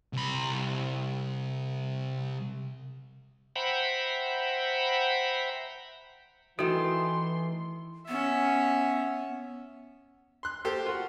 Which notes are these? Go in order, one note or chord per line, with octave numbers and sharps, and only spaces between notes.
C2 B5
C5 E5 F#5 G5 A#5 B5
D#3 E3 A3 F#4 C6
B3 C#4 E5
C6 F#6
A#3 G4 A4 C5
F4 F#4